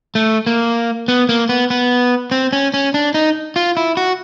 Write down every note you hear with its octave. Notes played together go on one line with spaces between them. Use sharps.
A3
A#3
B3
A#3
B3
B3
C4
C#4
C#4
D4
D#4
F4
E4
F#4